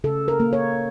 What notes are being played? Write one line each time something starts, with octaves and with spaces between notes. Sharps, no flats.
C#3 A4
A#4
A#3
C#5